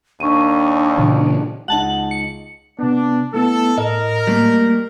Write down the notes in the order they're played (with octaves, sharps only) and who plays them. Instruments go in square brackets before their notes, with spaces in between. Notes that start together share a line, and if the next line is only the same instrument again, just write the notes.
[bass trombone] D#2 [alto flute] D4 [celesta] C#6 D#7
[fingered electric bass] A#2 C#3 E3
[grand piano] C#2 D#4 [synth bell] F#5 A5 F#7
[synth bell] C#7
[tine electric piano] C3 B3 [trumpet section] D4
[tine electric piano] A3 B3 E4 [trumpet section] A4
[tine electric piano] A2 [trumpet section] A#4 [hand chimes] D#5
[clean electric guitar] G3 A3 A#3